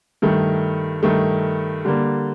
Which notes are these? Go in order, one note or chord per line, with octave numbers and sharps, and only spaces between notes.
G2 D#3 A3
G2 D#3 A3
D3 G3 A#3